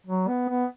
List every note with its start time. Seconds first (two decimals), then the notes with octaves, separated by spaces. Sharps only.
0.07 F#3
0.28 B3
0.49 B3